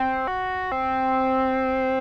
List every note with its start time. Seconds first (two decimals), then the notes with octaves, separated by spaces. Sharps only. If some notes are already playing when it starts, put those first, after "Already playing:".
Already playing: C4
0.27 F#4
0.72 C4